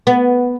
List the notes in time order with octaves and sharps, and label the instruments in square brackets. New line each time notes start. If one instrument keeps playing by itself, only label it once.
[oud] B3